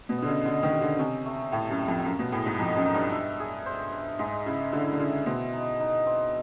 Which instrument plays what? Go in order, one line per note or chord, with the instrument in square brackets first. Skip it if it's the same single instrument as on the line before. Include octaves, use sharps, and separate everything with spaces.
[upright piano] B2
[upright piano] D3 [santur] D#5
[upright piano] C#3
[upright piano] D3 [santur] D#5
[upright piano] D#3
[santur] G4
[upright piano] D3
[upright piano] C3 [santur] C#4
[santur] A3
[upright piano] A2 [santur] A3
[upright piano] F#2
[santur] A3
[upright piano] F2
[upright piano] F#2 [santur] A#3
[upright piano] B2
[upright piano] A2 [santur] G#4
[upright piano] G#2
[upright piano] F2 [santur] D#4
[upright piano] F#2
[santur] D#4
[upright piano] G2
[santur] E5
G#4
C5
E5
[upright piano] G#2 [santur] G#3
[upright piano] C#3 [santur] E4
[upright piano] D3 [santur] E4
[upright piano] D3
[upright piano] C#3 [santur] E4
[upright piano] B2 [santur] C4
[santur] D#4
D#4
C4